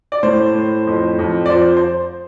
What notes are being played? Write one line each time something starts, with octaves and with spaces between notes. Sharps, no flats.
D5
A2 C5
A2
F2
F2
D5
F3 C5
C5